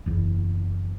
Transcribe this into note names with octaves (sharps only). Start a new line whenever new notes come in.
F#1 E2